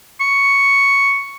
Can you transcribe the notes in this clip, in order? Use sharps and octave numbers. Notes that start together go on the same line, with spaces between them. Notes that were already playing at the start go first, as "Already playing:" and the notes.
C#6